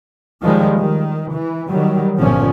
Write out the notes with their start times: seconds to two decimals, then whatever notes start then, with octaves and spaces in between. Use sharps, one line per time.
0.42 D#2 D#3 F3 G3 G#3
0.78 D#3
1.33 E3
1.68 D#3 F#3 G3
2.19 G1 A#2 D3 F3 C#4